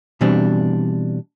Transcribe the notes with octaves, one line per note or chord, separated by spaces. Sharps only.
B2 E3 G3 C4 D4